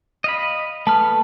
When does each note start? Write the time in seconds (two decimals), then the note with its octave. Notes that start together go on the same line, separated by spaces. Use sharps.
0.24 D#5 F5 B5
0.87 A3 B4 A5 F6